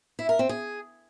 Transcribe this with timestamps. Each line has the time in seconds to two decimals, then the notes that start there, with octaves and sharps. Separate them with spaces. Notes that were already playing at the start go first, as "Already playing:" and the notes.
0.19 E4
0.29 A#4
0.39 C4
0.49 G#4